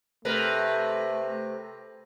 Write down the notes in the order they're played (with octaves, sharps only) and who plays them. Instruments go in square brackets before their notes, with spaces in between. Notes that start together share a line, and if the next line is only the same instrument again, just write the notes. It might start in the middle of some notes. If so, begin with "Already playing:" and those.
[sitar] C3 A#4 B4 [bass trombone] A3